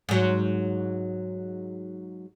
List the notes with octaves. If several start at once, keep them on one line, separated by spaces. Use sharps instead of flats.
G#2 F#3